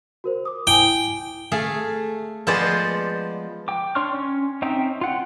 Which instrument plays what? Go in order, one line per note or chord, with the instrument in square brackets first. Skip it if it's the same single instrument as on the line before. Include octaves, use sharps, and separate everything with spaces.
[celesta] F#4 A#4 C5
D6 D#6
[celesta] E4 G#5 [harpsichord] G5
[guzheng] A3 G#4 F5
F3 G#3 B3 G#4 C5 D5
[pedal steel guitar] G5 D6
D4 C#5 C6 C#6 F6
C#4
C4 C#4 D#4 E5 G5
F4 F#5 G5